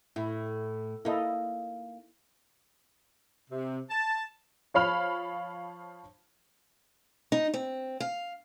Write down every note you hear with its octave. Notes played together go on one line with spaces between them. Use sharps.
A2 E4
A#3 D#4 E4 A4 D#5
C3
A5
F3 C#5 F5 B5 F6 F7
D#4
C4
F5